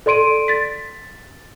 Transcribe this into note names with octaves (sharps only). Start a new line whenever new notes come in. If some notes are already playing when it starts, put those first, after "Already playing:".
A4 D5 C6 D7 D#7
A6 B6